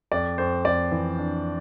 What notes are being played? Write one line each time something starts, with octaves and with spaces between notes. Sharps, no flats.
F2 D5
F2 C5
F2 D5
E3
D4